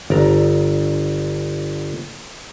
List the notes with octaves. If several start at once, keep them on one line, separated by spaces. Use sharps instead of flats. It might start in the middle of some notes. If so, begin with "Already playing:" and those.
G1 D5 A#5